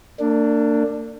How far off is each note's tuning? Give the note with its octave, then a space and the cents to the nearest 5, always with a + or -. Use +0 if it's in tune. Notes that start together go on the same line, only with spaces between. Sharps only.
A#3 -40 D4 +0